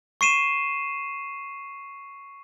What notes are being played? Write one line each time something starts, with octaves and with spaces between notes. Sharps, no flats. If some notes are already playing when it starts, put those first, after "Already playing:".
C#6 C7 D#7 E7